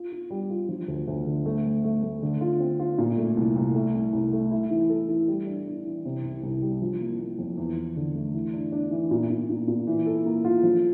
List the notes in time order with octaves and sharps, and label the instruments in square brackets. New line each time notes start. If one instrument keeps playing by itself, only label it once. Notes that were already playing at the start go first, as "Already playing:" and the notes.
Already playing: [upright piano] F4
F4
G3
F4
F3
D2
D2
D3
A3
A3
A3
A3
D3
F4
C4
F4
A#2
A3
C2
C2
A3
C2
C2
A3
E4
E3
A4
E3
G3
D4
D4
E3
C3
C2
C2
G3
F3
A#3
A#3
F2
E2
E2
D3
A3
E3
D4
D4
E3
A#2
A#2
A#2
A#2
E3
A4
A#3
F4
F3